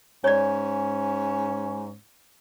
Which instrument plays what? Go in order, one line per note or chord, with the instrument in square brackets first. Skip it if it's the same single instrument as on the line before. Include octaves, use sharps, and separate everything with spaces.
[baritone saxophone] G#2 [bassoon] C#4 [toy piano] C#5 D5